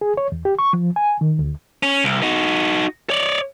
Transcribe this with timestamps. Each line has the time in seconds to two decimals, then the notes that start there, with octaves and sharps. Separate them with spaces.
0.01 G#4
0.17 C#5
0.32 E2
0.45 G4
0.59 C#6
0.73 F3
0.96 G#5
1.21 D#3
1.39 D2
1.83 C#4
2.04 C2
2.23 D#4 F#4
3.10 C#5 D5